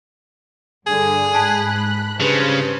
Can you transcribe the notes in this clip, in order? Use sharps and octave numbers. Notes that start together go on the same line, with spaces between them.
G2 D3 G#4
G#2 A5 B5 F#6
G2 C#3 B4 C5